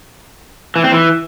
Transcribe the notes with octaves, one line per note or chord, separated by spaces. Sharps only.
E3
C4
E3